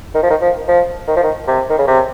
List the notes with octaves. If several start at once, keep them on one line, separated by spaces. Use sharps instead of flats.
D#3
F3
D#3
F3
F3
D#3
F3
D#3
C3
D#3
C#3
C3